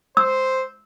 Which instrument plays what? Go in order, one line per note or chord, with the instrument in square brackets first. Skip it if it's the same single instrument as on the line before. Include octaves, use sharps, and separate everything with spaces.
[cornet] C5 [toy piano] E6